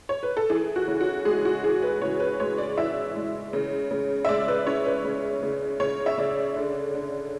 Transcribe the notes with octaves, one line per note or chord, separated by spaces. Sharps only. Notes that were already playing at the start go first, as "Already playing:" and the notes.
C#5
B4
A4
E3 G#4
F#4
C#3
F#4
G#3 G#4
F#4
E3 G#4
B4
C#3 C#5
B4
G#3 C#5
D5
E3 E5
G#3
C#3
C#3
E5
G#3 D5
B4
C#4 C#5
B4
C#3
C#3
C#3 C#5
E5
C#3 D5
D3
D3